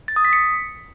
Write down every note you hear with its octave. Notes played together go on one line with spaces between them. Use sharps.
A6
D#6
B6
C#7